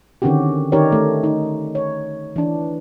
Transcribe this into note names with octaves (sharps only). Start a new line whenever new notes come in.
D3 D#3 C4 C#4 F#4 G4
D#3 D#4 G4 A#4 C#5 D5
A3
D#4
C#5
E3 D4